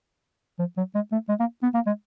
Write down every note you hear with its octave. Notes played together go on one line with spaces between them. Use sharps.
F3
F#3
G#3
A3
G#3
A#3
B3
A#3
G#3